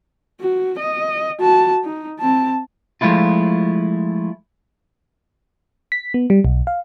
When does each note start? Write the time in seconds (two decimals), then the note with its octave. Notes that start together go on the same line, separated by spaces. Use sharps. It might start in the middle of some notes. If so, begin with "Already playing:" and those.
0.40 F#4
0.79 D#5
1.40 F#4 A5
1.84 D#4
2.20 C4 A5
3.01 F3 G#3 A3 E4 F4
5.92 B6
6.14 B3
6.30 G3
6.45 B1
6.67 F5